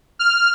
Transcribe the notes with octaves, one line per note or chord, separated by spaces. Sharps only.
F6